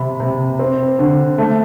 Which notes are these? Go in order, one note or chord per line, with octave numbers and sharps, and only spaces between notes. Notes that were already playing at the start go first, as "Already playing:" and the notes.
Already playing: C3 B5
C3
C4
D3
A3